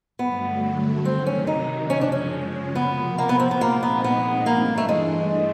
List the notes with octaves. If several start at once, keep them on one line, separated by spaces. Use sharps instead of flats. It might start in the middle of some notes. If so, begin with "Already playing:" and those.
G2 D3 F#3 A3 B3
C3 D#3 F#3 C4
C#4
D#4
F#2 C#3 F3 G#3 C#4
D4
C#4
C3 F3 A#3 B3
A#3
B3
C4
B3
A#2 F3 G#3 A#3 C4 D#4
B3
B3
G2 E3 A3 A#3 D4
A3
G#3